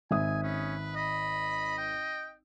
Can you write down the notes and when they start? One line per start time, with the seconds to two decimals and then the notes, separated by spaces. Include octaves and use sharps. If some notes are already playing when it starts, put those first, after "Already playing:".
0.11 G#1 E5 G#5 D#6
0.43 C#4 B4
0.96 D#5 B5
1.78 G5